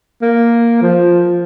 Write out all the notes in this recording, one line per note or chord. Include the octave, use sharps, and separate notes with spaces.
A#3
F3